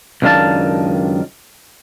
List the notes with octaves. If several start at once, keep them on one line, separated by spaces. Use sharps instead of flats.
C#2 F#2 D#3 D4 F5 A5